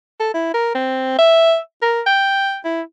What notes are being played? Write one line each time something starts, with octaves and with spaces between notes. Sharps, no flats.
A4
E4
A#4
C4
E5
A#4
G5
E4